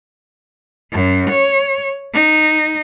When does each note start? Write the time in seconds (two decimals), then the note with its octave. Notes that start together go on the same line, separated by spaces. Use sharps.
0.92 F#2
1.30 C#5
2.13 D#4